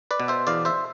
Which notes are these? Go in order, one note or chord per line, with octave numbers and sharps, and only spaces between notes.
B4 D5
B2
C5 E5
E2 D5 F5
C5 E5